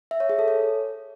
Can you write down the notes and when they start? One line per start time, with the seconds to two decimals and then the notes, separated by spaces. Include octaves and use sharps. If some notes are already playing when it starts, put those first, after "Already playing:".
0.11 E5
0.20 C#5
0.29 G#4
0.39 A4
0.48 C#5